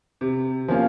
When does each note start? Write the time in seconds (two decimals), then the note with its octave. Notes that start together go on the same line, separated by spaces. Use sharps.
0.21 C3
0.68 F3 A#3 C#4 F4